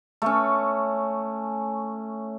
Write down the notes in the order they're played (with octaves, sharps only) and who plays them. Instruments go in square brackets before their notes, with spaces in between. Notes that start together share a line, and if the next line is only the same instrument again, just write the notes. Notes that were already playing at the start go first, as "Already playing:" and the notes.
[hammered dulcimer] A3 C#4